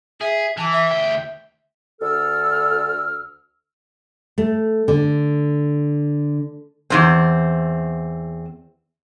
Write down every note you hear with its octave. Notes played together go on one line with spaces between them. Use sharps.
G#4 E5
E3 A5
E5
D2 G5
D2 D3 A4 E6 F6
A3
D3
E2 G#2 C4